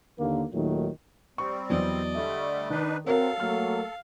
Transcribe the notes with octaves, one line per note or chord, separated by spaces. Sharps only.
D#2 D3 A#3
D#2 A#2 D#3 F#3 A3
G3 C4 C#6
E2 F#3 D5 D#5
D3 G3 A3 E5
D#3 D4 D#4 B4
C4 F#4 A4 A#4 C#5 F5 F#5
F#3 A3 A#3 F6